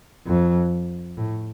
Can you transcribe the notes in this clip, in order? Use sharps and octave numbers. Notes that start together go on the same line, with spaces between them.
F2
A2